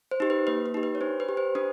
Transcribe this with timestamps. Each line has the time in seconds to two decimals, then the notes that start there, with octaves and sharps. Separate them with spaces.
0.11 C5
0.20 D#4 G4
0.30 B4
0.47 A#3 B4
0.66 B4
0.74 D#4 G4
0.83 B4
0.95 C#5
1.01 D4 C5
1.20 B4
1.29 G4
1.37 C5
1.55 D4 B4